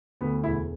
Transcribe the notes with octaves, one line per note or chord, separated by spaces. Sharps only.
D2 B3
E1 E4